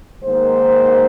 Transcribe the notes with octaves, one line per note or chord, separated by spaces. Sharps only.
G#2 D#3 A#3 C5